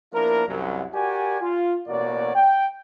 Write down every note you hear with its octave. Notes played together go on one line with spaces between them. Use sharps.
F3 A#3 B3 D4 E4 A#4
C2 F#2 F#3
F#4 G4 A#4 D5 G#5
F4
A1 B2 A#3 F#4 C#5 D5
G5